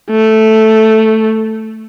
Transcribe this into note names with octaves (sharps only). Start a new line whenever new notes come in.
A3